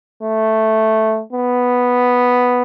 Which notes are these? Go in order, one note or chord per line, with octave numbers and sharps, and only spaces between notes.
A3
B3